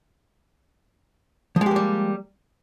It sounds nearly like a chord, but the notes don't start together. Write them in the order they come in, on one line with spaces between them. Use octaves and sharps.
F3 G#3 G4 A#3 G3